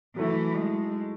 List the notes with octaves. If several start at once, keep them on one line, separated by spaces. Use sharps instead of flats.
E3 F#3 A3 E4
G#3